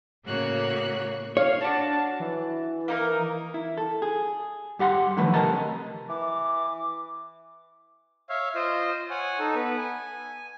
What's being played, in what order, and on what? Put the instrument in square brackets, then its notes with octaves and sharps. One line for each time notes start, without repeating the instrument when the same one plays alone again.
[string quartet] A2 C#3 A#3 F#4 C#5 F#6
[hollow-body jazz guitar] C#5 [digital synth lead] F5
[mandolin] D4 F#4 [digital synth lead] A5
[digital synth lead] E3
[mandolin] A#3 D#4 A#4
[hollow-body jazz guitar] E4
A4
G#4
G2 G4 F#5 A#5 C6
D3 D#3 F3 F#3 A3 B4
C3 A#4 D#5 A5 A#5
[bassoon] E3 [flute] D6
[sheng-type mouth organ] C#5 E5 F5
F4 C5 D#5
C#5 F#5 G#5
D#4 A4
B3 B4
G#5